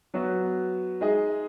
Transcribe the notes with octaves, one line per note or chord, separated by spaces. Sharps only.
F#3 B3 F#4
G#3 D#4 G#4 D#5